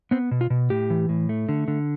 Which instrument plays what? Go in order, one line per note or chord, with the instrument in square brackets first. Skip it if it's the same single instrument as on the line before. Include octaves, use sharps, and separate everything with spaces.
[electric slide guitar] B3 C4
B2
F4
B2
A2 G4
E3
A2
A3
D3
D3